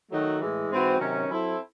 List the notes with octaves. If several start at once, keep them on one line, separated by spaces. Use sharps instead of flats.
D#3 F#3 A3 D#4 F#4
A2 E3 G#3
G#2 E3 C4 F#4
C3 D#3 F#3 C#4
F#3 C4 E4 A4